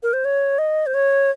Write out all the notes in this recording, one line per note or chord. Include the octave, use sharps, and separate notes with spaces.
A#4
C5
C#5
D#5
C5
C#5